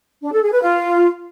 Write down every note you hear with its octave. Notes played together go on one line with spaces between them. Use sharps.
D4
A4
G#4
B4
F4